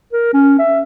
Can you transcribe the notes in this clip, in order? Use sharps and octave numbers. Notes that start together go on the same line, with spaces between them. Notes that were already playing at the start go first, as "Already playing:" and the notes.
A#4
C#4
E5